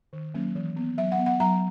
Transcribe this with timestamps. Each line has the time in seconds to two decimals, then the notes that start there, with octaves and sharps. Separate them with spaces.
0.13 D#3
0.34 F#3 A#3 C#4
0.55 E3
0.76 B3
0.98 F#3 E5
1.12 F#5
1.19 B3
1.26 F#5
1.40 F#3 A#5